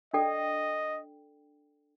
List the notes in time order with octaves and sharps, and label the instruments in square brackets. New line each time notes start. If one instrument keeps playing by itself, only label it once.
[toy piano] D4 A4 D5 G5 [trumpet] D#5